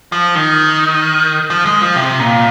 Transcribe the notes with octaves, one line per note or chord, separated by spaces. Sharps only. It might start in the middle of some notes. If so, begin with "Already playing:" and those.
F3
D#3
F3
G#3
F3
C3
A#2